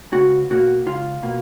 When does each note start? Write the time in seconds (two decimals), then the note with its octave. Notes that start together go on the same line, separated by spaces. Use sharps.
0.13 C#2 F#4
0.50 B2 A#3 F#4
0.86 C#2 F4
1.22 B2 A#3